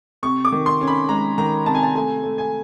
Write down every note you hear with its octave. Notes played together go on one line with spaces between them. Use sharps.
C3 C#6
D6
D#3
C6
C#4
B5
G#3 A#5
D#3 A#5
C3 A5
G#5
A5
A3 G#5
A3
G#5